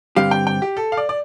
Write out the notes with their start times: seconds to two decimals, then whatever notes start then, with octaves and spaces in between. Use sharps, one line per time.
0.16 G2 D3 G3 C4 G4 F5
0.31 G5
0.47 G5
0.62 G4
0.77 A4
0.92 F5
0.97 D5
1.09 D5